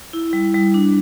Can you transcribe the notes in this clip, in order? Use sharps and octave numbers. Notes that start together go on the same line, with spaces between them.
E4
G3
G3
D4